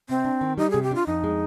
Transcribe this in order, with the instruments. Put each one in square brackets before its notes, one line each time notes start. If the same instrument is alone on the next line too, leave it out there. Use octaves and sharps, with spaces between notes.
[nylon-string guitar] C3 [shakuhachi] C4
[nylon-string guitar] D4
D#3
[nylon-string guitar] G3 [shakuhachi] D#4
[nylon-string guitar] C3 [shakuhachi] G#4
[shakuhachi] G4
[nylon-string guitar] D4 [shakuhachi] F4
[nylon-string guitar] F2 [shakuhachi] D#4
[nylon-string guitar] G#3